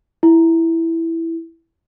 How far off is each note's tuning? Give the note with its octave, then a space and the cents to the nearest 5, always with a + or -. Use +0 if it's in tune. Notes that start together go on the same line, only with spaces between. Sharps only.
E4 +0